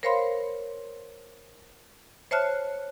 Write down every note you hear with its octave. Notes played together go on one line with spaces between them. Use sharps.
A#4 C5 C#5 F5 B5 C6
C5 C#5 E5 A5 F6 F#6